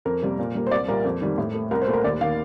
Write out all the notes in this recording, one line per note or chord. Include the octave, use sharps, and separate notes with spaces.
F2 A#4
C3 G3 A#3
A#2
G3 A#3
C5
C2 D5
A#2 G3 A#3 A#4
F2
D#3 G3
A2
A3
C2 A#4
C5
A#2 A3
A#4
D#2 D5
D#3 A#3 F5